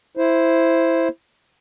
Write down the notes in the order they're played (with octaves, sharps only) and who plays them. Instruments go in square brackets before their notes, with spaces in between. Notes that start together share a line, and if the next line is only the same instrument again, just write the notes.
[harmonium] E4 C5